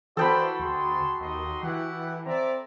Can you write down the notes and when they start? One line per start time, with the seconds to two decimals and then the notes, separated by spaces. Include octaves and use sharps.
0.17 E3 G#3 F#4 A4 C5 D5 G5 B5
0.60 D2 G#4 C6
1.21 D#2 D#4 D#5 C6
1.63 E3 E4 G4 F#5
2.26 C4 D5 E5 A#5